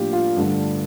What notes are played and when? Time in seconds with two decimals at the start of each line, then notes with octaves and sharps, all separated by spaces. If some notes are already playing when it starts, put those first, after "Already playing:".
Already playing: A2 F3 A#3 D4 F4 G4
0.13 F4
0.37 G2 D3 A3 D4 F4